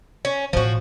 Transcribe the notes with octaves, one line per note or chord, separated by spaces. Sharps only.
C#4
A1 B2 F3 F#4